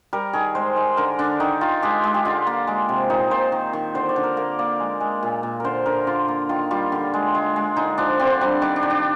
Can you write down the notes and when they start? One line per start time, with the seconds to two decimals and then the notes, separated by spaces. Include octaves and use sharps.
0.13 G3 A#4
0.33 D#3 G#4
0.55 G#3 C5
0.76 G#3
0.97 D3 A#4
1.19 D3 D4
1.40 D#3 D#4
1.61 D#3 F4
1.82 G#3 G4
2.04 G#3
2.14 G4
2.25 D3 F4
2.47 A#3
2.67 G#3
2.89 C3
3.10 A#2 D#4
3.31 A#2 C5
3.52 D#3
3.73 D#3
3.95 D3 C5
4.09 D5
4.16 D3
4.24 A#4
4.37 A#3 A#4
4.59 A#3 D5
4.80 G#3
5.00 G#3
5.23 A#2
5.43 A#2
5.60 D3 A#4 C5
5.86 D3 A#4
6.07 D3 F4
6.28 A#3
6.49 D#3 F4
6.71 G3 F4
6.92 D3
7.14 G#3
7.35 G#3
7.56 G#3
7.76 D3 D#4
7.98 F3 D4
8.19 D3 C4
8.41 G3 D4
8.62 D#3 D4
8.76 D4
8.83 D#3
8.90 D4